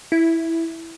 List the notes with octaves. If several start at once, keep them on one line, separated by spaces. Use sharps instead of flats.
E4